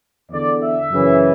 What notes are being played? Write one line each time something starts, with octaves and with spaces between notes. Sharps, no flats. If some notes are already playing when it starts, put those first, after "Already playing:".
E2 D3 D5
E5
F#2 C#3 E3